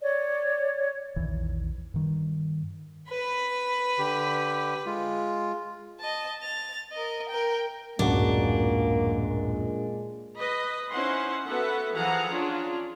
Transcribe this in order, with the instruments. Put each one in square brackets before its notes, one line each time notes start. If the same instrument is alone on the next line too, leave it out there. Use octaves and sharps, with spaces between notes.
[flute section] C#5 D5
[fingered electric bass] A#1 E2 D#3 E3
G2 D#3 G3
[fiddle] B4 B5
[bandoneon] D3 G4
G#3 F4
[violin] D#5 A5
A6 F7
A#4 D#5
A#4 G5
[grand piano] D1 F#2 F#4 [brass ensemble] A#2 G#3 [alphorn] A#3 [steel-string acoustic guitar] D4
[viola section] B4 D#5 B5
C#4 D#4 E4 C5 F#5 C6
B3 F#4 A4 B4 E5 F#5
E3 F3 G#4 F5 F#5 A#5
C#4 D4 F4 G#4